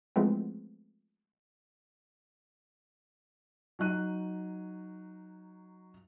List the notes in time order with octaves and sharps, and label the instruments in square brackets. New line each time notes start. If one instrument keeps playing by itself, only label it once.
[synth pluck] E3 F3 G#3 A3 B3 C4
[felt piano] F#3 D#4 F#6 D#7